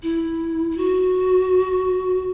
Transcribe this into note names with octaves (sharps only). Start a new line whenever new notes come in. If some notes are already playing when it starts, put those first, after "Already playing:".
E4
E4
F#4